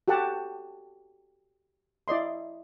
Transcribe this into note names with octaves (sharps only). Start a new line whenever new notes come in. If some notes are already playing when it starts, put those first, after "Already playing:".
F#4 G4 A4 F#5 A5
E4 D5 D#5 C6